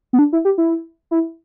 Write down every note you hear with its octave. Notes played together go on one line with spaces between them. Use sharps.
B3
D4
E4
G4
E4
E4